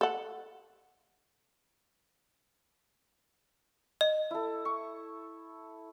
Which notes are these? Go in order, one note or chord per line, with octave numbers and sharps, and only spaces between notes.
A4 F#5
D#5
E4 A4
C#6